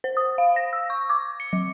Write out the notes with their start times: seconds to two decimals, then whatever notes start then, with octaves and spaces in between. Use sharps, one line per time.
0.04 C5
0.17 D#6
0.38 F5
0.56 A#6
0.73 E6
0.90 C#6
1.10 D6
1.40 C#7
1.53 F#3